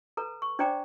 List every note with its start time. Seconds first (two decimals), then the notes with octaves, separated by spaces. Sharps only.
0.17 A4 B4 A#5
0.42 C#6
0.59 D4 C5 D5 G5 A#5 D6